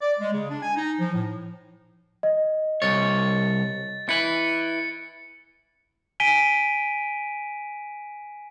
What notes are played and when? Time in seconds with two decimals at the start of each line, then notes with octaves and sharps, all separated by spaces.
0.01 D5
0.19 G#3
0.32 C#3
0.49 D4
0.62 G#5
0.76 D#4
0.99 F3
1.13 A2
2.23 D#5
2.82 C2 C#5 A6
4.09 E4 B4 C#7
6.20 G#5 B6 D7 D#7 G7